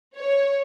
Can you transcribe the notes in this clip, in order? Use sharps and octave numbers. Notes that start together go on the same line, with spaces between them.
C#5